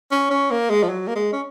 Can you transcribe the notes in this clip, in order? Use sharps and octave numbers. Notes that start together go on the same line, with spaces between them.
C#4
C#4
A#3
G#3
F3
F#3
A#3
G#3
C#4